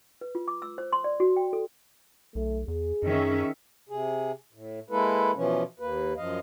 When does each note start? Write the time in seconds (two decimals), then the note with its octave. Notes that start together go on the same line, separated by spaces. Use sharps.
0.21 B4
0.35 F4
0.48 D6
0.62 E6
0.78 C5
0.92 C6
1.04 D5
1.20 F#4
1.36 G5
1.53 A4
2.35 B1 A3
2.68 E2 G#4
3.03 F#2 D#3 C#4 E5
3.89 C3 G#4
4.53 A2
4.90 G#3 A#3 E4 A4 B4
5.34 B2 E3 F3 C#4
5.79 D#2 A#3 B4
6.17 F#2 F3 D#5 F5